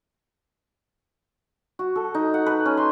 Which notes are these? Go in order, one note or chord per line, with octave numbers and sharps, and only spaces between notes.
F#4
A4
D#4
F#5
B4
C#4
C6